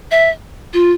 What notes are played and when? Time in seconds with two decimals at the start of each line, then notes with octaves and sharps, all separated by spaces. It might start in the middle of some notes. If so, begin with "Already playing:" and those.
0.11 E5
0.74 F4